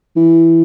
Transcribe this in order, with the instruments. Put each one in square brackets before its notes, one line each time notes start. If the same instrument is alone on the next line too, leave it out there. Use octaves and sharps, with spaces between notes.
[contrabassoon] E3